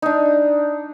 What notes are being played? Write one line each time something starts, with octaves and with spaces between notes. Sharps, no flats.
D4 D#4